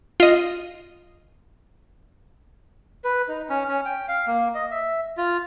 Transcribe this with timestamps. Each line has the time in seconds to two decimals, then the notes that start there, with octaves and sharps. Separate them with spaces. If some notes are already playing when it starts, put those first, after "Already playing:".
0.20 F4 D#5
3.04 B4
3.28 D#4
3.49 C#4
3.68 C#4
3.85 G5
4.08 F5
4.27 A#3
4.55 D#5
4.71 E5
5.18 F4